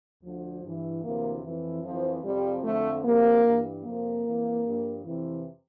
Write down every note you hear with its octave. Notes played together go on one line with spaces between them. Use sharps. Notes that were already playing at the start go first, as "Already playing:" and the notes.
D2 D3 F3
G2 E3
D2 C3 E3 A#3
F2 E3
F2 E3 F3
F2 C3 F3 G3
F2 D3 F3 A3
D2 C3 F3 A#3
G2 E3
F2 C3 F3 A#3
F2 E3
G2 F3
F2 C3 E3